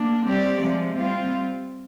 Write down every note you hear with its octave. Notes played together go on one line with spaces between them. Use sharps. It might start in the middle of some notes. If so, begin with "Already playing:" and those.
Already playing: A#3 D4
G3 C4 G4 D5
C3 F3 G#3
G3 C4 F4